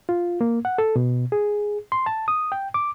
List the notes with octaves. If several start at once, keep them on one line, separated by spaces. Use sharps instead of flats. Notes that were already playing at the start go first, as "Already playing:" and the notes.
F4
A#3
F#5
A4
B2
G#4
C6
A5
D#6
G5
D6